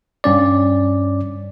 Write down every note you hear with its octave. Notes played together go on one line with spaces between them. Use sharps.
G2 C#4 D5